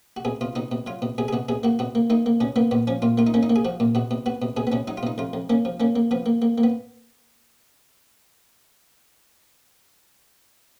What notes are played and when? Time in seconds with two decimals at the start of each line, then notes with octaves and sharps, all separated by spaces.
0.17 F#4
0.25 B2 G#4
0.41 B2 F4
0.56 B2 D#4
0.72 B2
0.86 F#3 F4
1.02 B2
1.18 B2 G#4
1.28 G#4
1.33 B2 F#4
1.49 B2 G#4
1.63 A#3 F#4
1.79 B2 F#4
1.95 A#3
2.10 A#3 D#4
2.26 A#3
2.40 B2 C#4
2.56 A#3 B3
2.71 A#2 B3
2.87 F3 C#4
3.02 A#2 F4
3.18 A#3 F4
3.27 D#4
3.34 A#3 C#4
3.43 D#4
3.50 A#3
3.56 G#4
3.65 F3 F#4
3.80 A#2
3.95 B2 F#4
4.11 B2
4.26 B3 F#4
4.42 B2
4.57 B2 G#4
4.67 B3
4.72 B2 C#4
4.88 F#3 D#4
4.97 F4
5.03 B2 D#4
5.18 F2 F4
5.33 F2
5.50 A#3 C#4
5.65 F3
5.80 A#3 C#4
5.96 A#3
6.11 F3 B3
6.26 A#3
6.42 A#3
6.58 A#3
6.63 B3